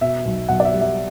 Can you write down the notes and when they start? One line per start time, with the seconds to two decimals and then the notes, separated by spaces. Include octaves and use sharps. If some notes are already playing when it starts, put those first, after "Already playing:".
0.01 B2 E5
0.25 B1
0.49 B1 F#5
0.60 D5
0.65 E5
0.73 G3
0.81 E5